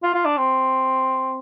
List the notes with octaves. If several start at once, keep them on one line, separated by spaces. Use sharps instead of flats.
F4
F4
D4
C4